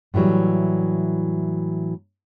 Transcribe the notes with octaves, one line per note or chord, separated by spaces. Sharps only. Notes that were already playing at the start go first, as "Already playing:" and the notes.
A2 D3 E3 F#3 G3